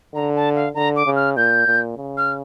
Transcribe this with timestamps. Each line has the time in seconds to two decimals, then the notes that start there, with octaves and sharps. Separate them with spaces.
0.14 D3 A#5
0.35 A5
0.55 F5
0.75 D3 A#5
0.96 D6
1.06 C#3
1.16 F6
1.37 A#2 G6
1.66 A#2
1.97 C#3
2.17 F6